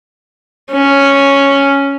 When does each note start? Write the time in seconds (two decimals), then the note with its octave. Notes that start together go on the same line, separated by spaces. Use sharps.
0.71 C#4